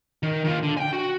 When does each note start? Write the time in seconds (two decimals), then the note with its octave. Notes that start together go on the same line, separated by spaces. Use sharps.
0.23 D#3
0.44 D#3 F4
0.63 D3
0.77 G5 G#5
0.93 F#4